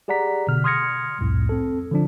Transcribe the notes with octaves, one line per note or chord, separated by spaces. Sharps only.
G4 G#4 D5 F#5 A#5 B6
B2 D3 F6
C6 D#6 F6 G#6 A#6 C#7
C2 F2 A2
C4 A4
D3 F3 D4